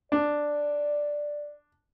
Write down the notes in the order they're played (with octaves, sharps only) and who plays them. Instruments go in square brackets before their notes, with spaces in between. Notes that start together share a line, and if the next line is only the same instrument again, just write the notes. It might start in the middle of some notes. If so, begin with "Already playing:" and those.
[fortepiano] D4 [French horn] D5